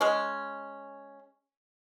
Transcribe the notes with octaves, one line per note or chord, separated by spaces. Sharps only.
G#3 C#4